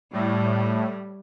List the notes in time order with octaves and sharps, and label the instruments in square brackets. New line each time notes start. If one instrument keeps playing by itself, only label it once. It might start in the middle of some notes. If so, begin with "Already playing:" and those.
[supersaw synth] A2 [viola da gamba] G3